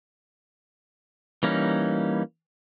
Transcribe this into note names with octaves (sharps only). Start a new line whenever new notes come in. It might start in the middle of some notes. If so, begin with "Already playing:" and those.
E3 G3 A#3 C#4 D#4